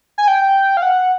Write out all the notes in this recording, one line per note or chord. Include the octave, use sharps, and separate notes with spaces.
G#5
G5
F5
F#5